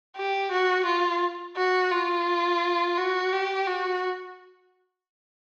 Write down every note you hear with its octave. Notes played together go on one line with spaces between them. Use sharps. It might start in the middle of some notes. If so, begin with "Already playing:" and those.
G4
F#4
F4
F#4
F4
F#4
G4
F#4